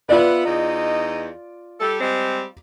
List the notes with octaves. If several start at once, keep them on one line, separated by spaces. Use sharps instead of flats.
B3 F4 B4 D5 E5
E2 D#4 D#5
G3 A4
G3 G#3 C4